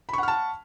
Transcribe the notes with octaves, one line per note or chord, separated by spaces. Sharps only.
F#5 A5 B5 C#6 F6